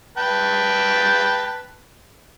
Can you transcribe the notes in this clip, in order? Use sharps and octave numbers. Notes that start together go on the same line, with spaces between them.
B4 G5 A5